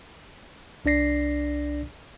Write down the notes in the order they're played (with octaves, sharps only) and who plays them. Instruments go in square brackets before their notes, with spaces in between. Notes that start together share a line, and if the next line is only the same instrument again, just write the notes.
[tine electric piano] C2 D4 D5 A#6 C7